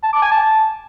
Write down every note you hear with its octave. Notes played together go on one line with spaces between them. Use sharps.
A5
D6
G#5
A5